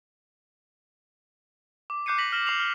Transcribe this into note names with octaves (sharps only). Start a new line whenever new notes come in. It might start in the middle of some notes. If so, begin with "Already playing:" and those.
D6
D6 F#6 G6 C7 C#7 D#7
A#6 B6 F#7
F6 A#6 E7 F#7
D6 C7 F7 F#7
F6 G7